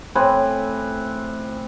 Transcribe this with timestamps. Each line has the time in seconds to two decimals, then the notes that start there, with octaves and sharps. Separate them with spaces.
0.15 A2 C4 B4 G#5